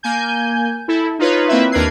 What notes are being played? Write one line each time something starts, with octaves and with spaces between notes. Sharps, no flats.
A#3 G#5 G6
E4 A4
D#4 F4 B4 C#5
A#3 C4 E4 B4 E5
D#2 D4 A#4 B4 G#6 C7